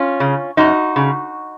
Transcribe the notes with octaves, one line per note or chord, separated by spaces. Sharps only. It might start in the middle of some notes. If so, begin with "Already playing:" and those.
Already playing: C#4 F4
C#3
F#2 D#4 F#4
C#3